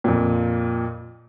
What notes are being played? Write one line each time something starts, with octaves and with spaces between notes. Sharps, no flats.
F2 A#2